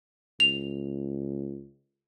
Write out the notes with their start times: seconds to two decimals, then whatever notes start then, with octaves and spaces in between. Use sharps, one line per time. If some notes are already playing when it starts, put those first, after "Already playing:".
0.40 C#2 F7